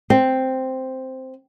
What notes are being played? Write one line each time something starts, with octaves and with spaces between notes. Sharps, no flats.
C4